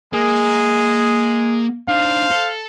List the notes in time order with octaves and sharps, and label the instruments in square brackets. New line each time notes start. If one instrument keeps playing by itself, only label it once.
[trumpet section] G#3 G#4 [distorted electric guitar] A#3
[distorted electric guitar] D4 D#4 [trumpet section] C5 F5
[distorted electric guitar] A4